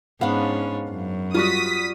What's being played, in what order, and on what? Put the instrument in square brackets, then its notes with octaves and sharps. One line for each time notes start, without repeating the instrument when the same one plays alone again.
[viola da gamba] G#2 C#4 [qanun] B3 D4 [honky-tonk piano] F5
[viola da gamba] F#2
[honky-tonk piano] G3 C#6 [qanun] F4 F#4 [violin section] D#6 B6